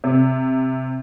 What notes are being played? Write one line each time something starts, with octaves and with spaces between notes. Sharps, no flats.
C3